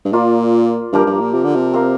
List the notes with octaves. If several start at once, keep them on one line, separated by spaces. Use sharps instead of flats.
G2
A#2 A#3 F4 D5
G2 F3 A#3 G4 A#4
G2
A#2
C3
D3
C3
C4 A#4 F5